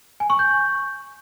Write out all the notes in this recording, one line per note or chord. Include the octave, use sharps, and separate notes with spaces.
G#5
C#6
G6